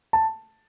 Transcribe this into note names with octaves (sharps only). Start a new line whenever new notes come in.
A5